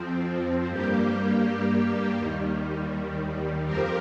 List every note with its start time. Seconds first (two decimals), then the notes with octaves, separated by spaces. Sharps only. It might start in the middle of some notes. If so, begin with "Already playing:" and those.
Already playing: F2 F3 C4
0.68 G2 G3 A#3 G4
2.17 D#2 D#3 G3
3.66 F2 F3 C4 G4 A#4